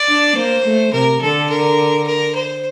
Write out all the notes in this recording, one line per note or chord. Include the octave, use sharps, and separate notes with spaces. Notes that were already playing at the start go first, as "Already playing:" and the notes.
Already playing: D5
D4
A#3 C5
A3
C3 A#4
D3 A4
A#4
A#4
C5